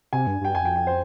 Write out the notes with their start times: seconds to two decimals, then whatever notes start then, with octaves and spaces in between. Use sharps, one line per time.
0.13 C3 G#5
0.27 G2
0.41 G2 G5
0.55 F2 G#5
0.65 G5
0.76 G5
0.87 C5